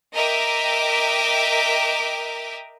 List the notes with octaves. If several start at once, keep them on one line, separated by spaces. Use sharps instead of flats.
A#4 D#5 E5 G5 D6